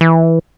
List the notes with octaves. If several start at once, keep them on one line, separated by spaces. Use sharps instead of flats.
E3